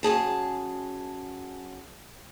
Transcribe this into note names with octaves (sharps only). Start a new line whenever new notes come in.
F#2 C3 G#4 A5